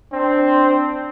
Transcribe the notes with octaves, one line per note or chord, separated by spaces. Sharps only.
C4 D4